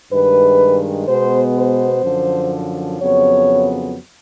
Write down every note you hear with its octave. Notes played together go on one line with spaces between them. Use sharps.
G2 D#3 G#3 B4
B2 G#3 B3 C5
C5
F#2 D3 F3
F2 C#3 F#3 B3 C#5